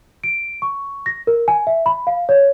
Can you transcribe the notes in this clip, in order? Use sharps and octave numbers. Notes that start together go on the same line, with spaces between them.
D7
C#6
A#6
A#4
G#5
E5
B5
F5
C#5